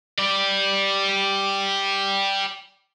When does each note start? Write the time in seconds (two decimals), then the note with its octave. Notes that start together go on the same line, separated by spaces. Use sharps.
0.19 G4 D5